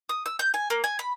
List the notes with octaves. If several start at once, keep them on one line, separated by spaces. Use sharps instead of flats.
D#6
E6
G6
G#5
A#3
G#5
B5